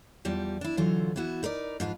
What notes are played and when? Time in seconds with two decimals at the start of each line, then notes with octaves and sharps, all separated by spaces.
0.25 E2 F3 G3
0.61 D4 E4
0.77 D3 E3 F#3 F4 C5
1.16 E3 B3 E4 F#4
1.43 D#4 A#4 B4 D5
1.80 G#2 F3 F4 B4